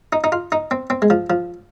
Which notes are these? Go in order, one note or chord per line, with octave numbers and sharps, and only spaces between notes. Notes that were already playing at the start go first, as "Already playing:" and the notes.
D#4
D#4
F4
D#4
C4
C4
G#3
F3
F3